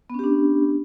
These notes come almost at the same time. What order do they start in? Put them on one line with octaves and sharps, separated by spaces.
B3 C#4 G4 D4